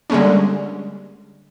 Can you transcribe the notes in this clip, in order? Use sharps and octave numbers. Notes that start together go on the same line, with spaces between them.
D3 G3 G#3 A#3 C#4